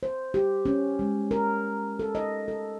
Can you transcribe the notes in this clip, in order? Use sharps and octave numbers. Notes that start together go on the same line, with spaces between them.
C5
G4
C#4
G#3
A#4
A4
D#5
A4